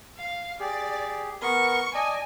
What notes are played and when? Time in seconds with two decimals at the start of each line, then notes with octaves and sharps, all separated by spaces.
0.17 F5
0.60 G4 G#4 D5
1.42 B3 A#4 C#6
1.94 D5 D#5 G#5 A5